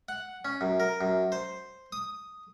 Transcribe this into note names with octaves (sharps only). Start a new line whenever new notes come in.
F#5
C#4
F#2
A#4
F#2
C5
D#6